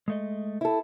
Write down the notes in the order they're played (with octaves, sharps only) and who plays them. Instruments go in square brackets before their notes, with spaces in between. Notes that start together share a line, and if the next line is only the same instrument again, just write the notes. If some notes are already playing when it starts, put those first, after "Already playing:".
[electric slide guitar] G#3 A3 D#5
[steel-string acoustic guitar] E4 A4